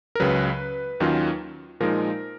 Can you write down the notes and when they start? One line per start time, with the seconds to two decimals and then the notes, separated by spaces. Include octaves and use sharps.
0.15 A#4
0.20 C#2 C#3 F#3 B4
1.00 D#2 D#3 F#3 C#4 F4
1.80 A#2 F3 G#3 D#4 A#4